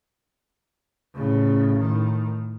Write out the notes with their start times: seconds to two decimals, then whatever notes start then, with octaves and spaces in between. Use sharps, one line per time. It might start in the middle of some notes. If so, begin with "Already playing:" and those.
1.15 A2 C#3
1.79 A2 D#3